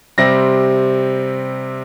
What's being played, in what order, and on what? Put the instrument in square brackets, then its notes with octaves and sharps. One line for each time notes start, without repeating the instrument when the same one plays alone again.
[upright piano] C3 G3 C4 A#6